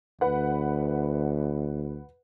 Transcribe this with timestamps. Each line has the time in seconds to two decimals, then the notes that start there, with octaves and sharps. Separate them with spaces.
0.21 D2 B4 F#5